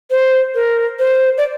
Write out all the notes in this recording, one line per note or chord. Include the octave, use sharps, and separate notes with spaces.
C5
A#4
C5
D5